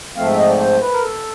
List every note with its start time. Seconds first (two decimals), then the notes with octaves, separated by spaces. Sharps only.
0.17 G#2 F3 A3 C4 F5
0.27 E5
0.38 D#5
0.49 D5
0.60 C5
0.82 B4
0.93 A#4
1.03 A4